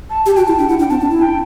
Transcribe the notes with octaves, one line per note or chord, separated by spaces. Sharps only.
A5
G4 A5
F#4 G5
E4 A5
D4 G5
E4 F#5
D4 G5
C4 A5
D4
E4
G5